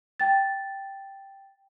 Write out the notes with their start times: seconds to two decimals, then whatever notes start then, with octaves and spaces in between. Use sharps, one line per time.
0.20 G5 A6